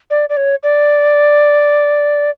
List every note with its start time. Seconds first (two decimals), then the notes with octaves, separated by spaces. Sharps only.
0.10 D5
0.29 D5
0.37 C#5
0.63 D5